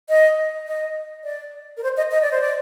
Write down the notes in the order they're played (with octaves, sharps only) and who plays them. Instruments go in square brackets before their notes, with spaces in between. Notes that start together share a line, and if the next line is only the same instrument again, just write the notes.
[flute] D#5
D#5
D5
A#4
C5
D#5
D#5
D5
C5
D5